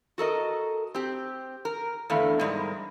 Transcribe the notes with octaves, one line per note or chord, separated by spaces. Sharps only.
F#4 A4 A#4 D#5
C4 G4
A#4
E2 D3 A3 B3 F5
G#2 G3 G#3 A#4